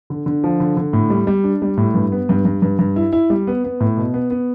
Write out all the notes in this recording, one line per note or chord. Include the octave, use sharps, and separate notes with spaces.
D3
D3
F3
D3
D3
A2
G3
G3
D4
G3
A2
G2
B3
G2
G2
G2
G2
E4
E4
G3
B3
B3
A2
B2
B3
B3